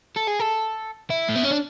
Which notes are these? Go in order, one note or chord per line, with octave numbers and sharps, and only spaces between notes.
A4
G#4
A4
E4
A3
B3
C#4
D4